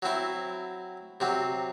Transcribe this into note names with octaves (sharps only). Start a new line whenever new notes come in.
F#3 C4 E4
C3 F#3 C4